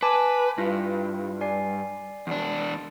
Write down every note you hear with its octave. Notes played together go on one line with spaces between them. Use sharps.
B4 G#5 A5 D6
G2 E4 F4 B4
D5 G#5 C7
E2 D4